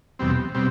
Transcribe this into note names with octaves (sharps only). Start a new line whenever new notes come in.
E2 B2 G3 C4
B2 G3 C4